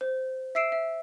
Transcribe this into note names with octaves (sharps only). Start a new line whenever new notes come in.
C5
E5 E6 C7 D7 E7
E5